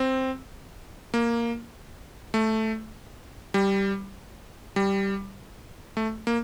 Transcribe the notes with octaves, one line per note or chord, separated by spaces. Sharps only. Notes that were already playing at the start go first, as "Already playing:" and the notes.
Already playing: C4
A#3
A3
G3
G3
A3
A#3